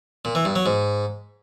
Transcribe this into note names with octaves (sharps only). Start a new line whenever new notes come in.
A#2
E3
G2
F#3
G#2